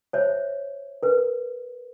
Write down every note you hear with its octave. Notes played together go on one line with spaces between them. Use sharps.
C5 C#5 E5
A#4 B4